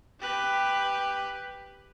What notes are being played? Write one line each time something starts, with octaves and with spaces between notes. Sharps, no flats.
G4 B4